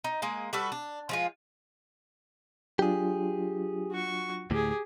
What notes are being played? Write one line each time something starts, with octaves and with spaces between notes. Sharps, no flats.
D#4
G#3 A#3 G#4
G3 F#4 A4 B4
D4
F3 G#3 F4
F#3 D4 F4 G4 G#4
F#4 C#6
D2 A2 G4 G#4